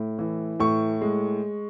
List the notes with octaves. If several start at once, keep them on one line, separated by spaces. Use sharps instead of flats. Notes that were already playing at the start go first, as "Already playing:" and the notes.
Already playing: A2
E3
A2 C#6
G#3